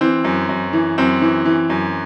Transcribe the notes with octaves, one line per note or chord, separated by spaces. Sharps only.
E3 C4
F#2
F#2
E3
F#2 C4
E3
E3
F#2